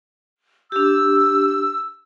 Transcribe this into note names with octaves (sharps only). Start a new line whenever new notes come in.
D4 G4 E6